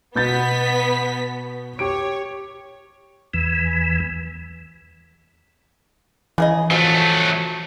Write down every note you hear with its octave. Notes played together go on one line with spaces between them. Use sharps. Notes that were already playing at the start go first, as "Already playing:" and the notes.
B2 B3 G6 A6 B6
G4 C#5 D7
E2 E3
C#3 E3 G#4 D#5
F3 F#3 A3